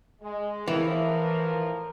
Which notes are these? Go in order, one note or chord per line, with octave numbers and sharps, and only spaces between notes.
G#3
A2 E3 F3 A#4